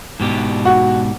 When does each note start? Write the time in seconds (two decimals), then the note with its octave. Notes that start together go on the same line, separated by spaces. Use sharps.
0.20 G#2 B2 G4
0.65 F#4